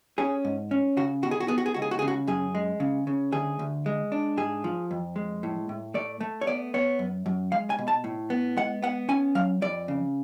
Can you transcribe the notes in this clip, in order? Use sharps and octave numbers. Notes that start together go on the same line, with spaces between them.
C#4 G#4
G#2
C#4
C#3 F#4
B2 F#4
G#4
F#4
B3 G#4
F#4
G#4
C#2 F#4
G#4
F#4
C#3 G#4
F#4
F#2 G#4
G#3
C#3
C#3
D2 G#4
D2
G#3
D4
G#2 G#4
F3
F2
G#3
A2
A2
A3 D5
A3
C#5
B3 D5
B3 C#5
F#2
F#2
G#3 F5
G#5
B2
A5
A2
B3
G#3 F#5
B3 F#5
C#4 G#5
F#3 F5
F2 D5
C#3